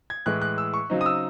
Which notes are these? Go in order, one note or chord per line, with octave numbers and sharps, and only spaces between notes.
G#6
A2 E3 G#3 F#6
F#6
E6
C#6
C#3 F#3 C4 D#4
D#6
E6